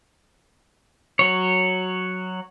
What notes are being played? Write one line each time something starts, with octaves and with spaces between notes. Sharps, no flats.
F#3 C#5